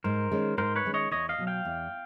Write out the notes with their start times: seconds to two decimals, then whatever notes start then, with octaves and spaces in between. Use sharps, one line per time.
0.04 G#2 A#4 C5
0.32 D#3 G#3 C#4
0.58 G#2 A#4 C5
0.76 B4 C#5
0.85 D#3 G#3 C#4
0.94 C#5 D#5
1.11 E2 C#5 D#5
1.29 D#5 F5
1.38 B2 F#3
1.47 F5 G5
1.65 E2